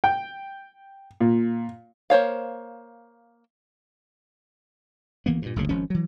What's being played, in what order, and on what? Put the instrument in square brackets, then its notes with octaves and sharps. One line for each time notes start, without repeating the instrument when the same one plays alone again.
[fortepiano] G5
A#2
[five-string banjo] A#3 C5 C#5 F5
[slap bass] D2 E3 A#3 B3
G2 A#2
F#1 D2 C#3
G#1 F3 C#4
E3 F#3